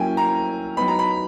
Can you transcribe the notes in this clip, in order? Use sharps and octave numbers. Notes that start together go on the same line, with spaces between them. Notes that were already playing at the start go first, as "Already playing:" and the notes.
Already playing: F#3 A#3 C#4 E4 G5 G#5
A#5
F#3 B3 D#4 B5
A#5
B5